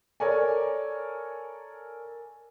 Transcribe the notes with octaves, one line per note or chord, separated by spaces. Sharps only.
A4 A#4 C#5 D5 G#5